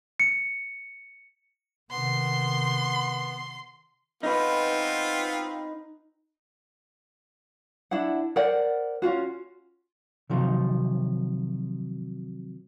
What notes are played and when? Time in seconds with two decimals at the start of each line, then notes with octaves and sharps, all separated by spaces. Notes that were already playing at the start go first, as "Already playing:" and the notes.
0.20 C#7
1.91 C3 D#3 B3 C6
4.23 B3 C4 D#4 F4 B4
7.91 D4 E4 F#5
8.36 A#4 C5 D5 F#5
9.02 C#4 D4 F4 F#4
10.30 C3 D#3 F3 F#3 D#4